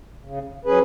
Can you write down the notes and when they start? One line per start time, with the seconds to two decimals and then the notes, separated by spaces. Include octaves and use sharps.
0.25 C#3
0.65 F#3 C#4 G#4 B4